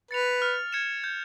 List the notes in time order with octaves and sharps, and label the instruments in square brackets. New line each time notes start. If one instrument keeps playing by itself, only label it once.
[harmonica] B4 [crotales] A6 C#7 F7
[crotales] F6
G#6 C#7 E7
G6